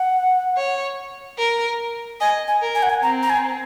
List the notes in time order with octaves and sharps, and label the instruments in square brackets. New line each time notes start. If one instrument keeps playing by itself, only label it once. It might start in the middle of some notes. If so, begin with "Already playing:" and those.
Already playing: [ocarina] F#5
[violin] C#5
A#4
[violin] D#5 [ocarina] G#5
[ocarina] G#5
[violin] A#4
[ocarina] G#5
F#5
G#5
[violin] C4 [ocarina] A#5
[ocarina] A#5
G#5